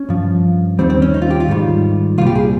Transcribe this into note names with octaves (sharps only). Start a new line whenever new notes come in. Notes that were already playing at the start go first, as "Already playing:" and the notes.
Already playing: C#4
G2 F3
D#2 D#3 G3 C4
C4
C#4
D#4
F4
G4
F4
G#2 D#3 G3
C2 A#2 G3 F4
G4
G#4